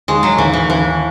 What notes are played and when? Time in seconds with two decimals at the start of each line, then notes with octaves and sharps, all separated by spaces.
0.08 D#2 G#3
0.23 F#3
0.38 D#2 E3
0.53 E3
0.69 D#2 E3